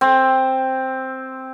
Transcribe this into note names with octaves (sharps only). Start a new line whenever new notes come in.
C4